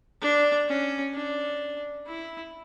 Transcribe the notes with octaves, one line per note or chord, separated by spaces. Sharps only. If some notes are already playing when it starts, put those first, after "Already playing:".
D4
C#4
D4
E4